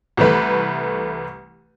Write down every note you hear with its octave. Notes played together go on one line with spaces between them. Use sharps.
C2 E3 A3 B4